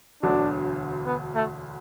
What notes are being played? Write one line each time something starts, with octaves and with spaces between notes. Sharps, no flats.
E1 D2 D3 F#3 D4
B3
A3